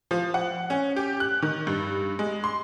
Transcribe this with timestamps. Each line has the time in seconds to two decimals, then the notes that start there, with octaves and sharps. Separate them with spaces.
0.11 F3
0.34 F#5
0.70 C#4
0.96 G4
1.20 F#6
1.42 D#3
1.67 G2
2.19 G#3
2.44 C6